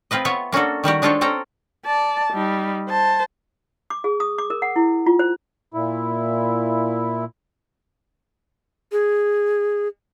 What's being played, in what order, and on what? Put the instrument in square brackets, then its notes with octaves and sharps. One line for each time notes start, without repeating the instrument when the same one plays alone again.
[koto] C4 F4 B4 D#5
B3 F4 C#5 E5
A#3 C#4 D4 F#4 A4
D#3 G3 F#4 G4
G#3 D4 F4 A4 C5 C#5
C4 C#4 A4 A#5
[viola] D5 A5
G3 D#4
C5 A5
[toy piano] D6
G#4
D#6
D6
A#4
F#5
E4
F4
C5
[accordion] A#2 E4
[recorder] G#4